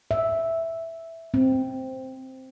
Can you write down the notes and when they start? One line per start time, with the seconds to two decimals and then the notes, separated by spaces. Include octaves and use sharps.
0.11 E5
1.34 C4